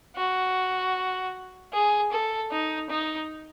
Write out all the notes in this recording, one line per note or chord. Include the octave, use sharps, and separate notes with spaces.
F#4
G#4
A4
D#4
D#4